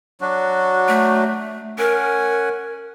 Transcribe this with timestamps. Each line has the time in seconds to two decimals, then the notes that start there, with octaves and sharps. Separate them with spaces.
0.21 F#3 D4 F#4
0.88 A3
1.78 C#4 A#4 F#5 G#5